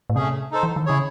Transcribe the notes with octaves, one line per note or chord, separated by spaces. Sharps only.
A2
C3 A3 C#4 G#4
D#4 A4 C5
E3
D#3
C#3 E4 G#4 C#5